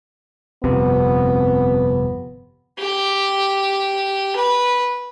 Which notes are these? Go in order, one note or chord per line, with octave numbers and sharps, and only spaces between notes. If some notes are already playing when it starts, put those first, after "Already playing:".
G1 F2 C3 B3
G4
B4